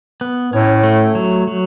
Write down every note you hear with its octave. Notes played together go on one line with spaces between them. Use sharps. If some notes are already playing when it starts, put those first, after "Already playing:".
B3
A2 C#4
A3
F#3
F#3